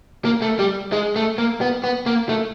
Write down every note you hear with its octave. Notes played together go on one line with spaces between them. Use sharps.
A#3
A3
G3
G#3
A3
A#3
B3
B3
A#3
A3